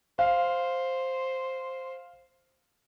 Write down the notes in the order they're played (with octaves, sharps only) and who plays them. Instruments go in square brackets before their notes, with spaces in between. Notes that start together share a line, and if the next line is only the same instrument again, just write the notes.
[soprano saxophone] C5 [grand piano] F5